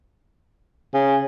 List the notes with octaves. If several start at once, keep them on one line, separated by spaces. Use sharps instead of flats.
C#3